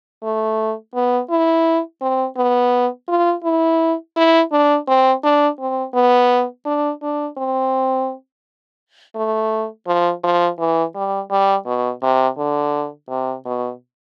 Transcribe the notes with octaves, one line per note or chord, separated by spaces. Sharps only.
A3
B3
E4
C4
B3
F4
E4
E4
D4
C4
D4
C4
B3
D4
D4
C4
A3
F3
F3
E3
G3
G3
B2
C3
D3
C3
B2